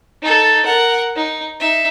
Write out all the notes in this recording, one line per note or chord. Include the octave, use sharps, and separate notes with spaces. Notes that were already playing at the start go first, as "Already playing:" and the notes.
D#4 A4
A#4 F#5
D#4
D#4 E5